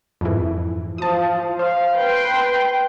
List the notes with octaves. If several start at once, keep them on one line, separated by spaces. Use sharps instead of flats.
F2 G#2 E3
F3 A5 D#6
C5 F5
B4 G5 C6